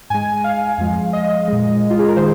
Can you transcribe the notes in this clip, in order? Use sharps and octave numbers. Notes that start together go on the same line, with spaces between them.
G#2 G#3 G#5
F5
F2 F3 G#3
D#5
A#2 G#3
F4
G#4
A#4
D#3 G#3 C5